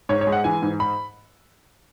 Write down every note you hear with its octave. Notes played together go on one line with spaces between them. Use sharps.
G#2 C#5
C#5
G#3
F#5
E3 G#5
G#2
B5